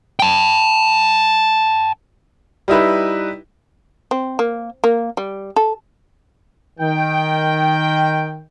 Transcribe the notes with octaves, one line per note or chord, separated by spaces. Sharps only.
G5 A5
G3 D#4 E4 B4
C4
A#3
A#3
G3
A4
D#3 G5